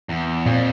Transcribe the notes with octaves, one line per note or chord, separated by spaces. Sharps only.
E2
F2 A#2